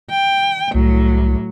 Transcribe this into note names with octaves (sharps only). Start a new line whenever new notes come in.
G5
C2 A2 F#3